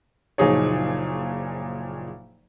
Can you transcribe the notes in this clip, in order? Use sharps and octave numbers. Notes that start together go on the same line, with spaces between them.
F#1 A#2 F3 D#4 G#4 C#5